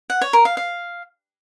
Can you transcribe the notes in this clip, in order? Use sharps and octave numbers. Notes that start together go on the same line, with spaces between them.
F#5
C#5
A#4
F5
F5